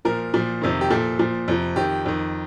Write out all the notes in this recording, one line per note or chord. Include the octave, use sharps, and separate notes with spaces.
A#2 F3 A#4
A#2 F3
F2 C3 D#3
G4
A#2 F3 A4
A#2 F3
F2 C3 F3
F2 D#3 G4
F2 D#3